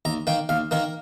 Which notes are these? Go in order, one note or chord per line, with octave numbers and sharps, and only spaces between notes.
D#2 A#5
D#3 A#3 G5
D#2 F5
D#3 A#3 A#4